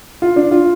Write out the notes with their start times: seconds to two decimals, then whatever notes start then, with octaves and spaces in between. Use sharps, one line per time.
0.22 F4
0.36 D4
0.51 F4